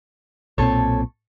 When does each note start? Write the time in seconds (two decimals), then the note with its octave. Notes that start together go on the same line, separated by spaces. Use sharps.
0.58 B1 A#2 C4 A4 C#5